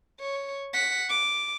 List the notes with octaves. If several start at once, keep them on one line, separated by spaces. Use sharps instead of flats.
C#5
F#5 B6
D6